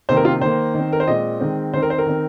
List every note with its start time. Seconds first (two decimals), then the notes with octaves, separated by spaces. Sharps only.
0.09 C3 D#3 A#3 C5
0.17 A#4
0.25 F4
0.41 D#3 A#3 C5
0.74 D#3 C4
0.93 A#4
1.00 C5
1.08 A#2 G#3 C4 D#5
1.40 D#3 G#3 C4
1.74 D#3 C5
1.76 C4
1.82 A#4
1.90 C5
1.98 A#4
2.06 D#3 C4